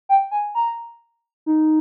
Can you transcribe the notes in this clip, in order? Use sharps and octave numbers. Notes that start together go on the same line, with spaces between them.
G5
G#5
A#5
D#4